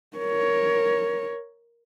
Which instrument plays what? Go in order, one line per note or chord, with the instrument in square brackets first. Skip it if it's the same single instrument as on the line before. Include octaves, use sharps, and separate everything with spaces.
[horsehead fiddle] A#4 C#5